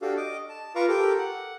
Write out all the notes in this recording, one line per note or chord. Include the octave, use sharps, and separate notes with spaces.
D4 F#4 G4 A4 F5
D#5 D6
A5
F4 B4 F5 A#5 C#6 D6
G4 A4 A#4 D6
F#5